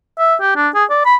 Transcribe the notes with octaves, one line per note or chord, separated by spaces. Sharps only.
E5
G4
D4
G#4
D5
B5